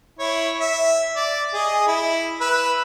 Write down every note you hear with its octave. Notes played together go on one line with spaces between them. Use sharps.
E4 C#5
E5
D5
G#4 D#5
E4
B4 E6